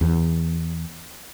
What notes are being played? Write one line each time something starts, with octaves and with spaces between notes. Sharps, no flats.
E2